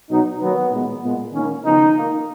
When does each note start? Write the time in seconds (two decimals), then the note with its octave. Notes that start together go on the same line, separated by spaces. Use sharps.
0.10 B2 F#3 B3 D#4
0.40 D#3 F#3 A#3 B3
0.71 A#2 G#3 B3
1.03 A#2 G#3 B3
1.33 D#3 A#3 C#4
1.64 C#3 F3 G#3 B3 D#4
1.96 D#3 A#3